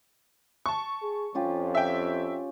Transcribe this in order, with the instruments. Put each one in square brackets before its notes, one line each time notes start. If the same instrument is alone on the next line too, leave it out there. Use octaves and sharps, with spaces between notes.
[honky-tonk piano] A5 C#6
[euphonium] G#4
[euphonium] F2 [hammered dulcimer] C#4 F4 G4
[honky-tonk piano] E5 G5